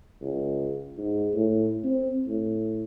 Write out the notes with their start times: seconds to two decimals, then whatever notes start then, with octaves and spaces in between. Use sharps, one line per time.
0.22 C#2
0.98 G#2
1.35 A2
1.85 C4
2.27 A2